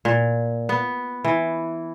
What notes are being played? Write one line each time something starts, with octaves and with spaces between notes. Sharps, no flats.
A#2
B3
E3